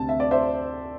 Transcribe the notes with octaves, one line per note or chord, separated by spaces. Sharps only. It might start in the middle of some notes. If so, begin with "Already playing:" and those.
Already playing: D2 C3 A3 C4 A5
E5
D5
C5 E5